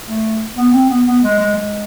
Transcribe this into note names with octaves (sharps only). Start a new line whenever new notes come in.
A3
B3
C4
B3
B3
G#3
G#3
G#3